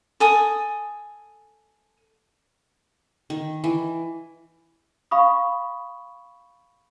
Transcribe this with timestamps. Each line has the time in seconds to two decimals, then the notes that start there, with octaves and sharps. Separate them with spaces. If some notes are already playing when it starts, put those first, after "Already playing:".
0.20 A4 G#5 D#6
3.30 D#3
3.64 E3
5.11 F5 B5 C#6 D#6